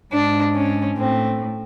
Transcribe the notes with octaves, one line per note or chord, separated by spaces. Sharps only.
G#2 D4
C#4
A2 C4